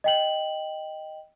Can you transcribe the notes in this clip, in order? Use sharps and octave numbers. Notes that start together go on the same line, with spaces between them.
D#5 G5 F#7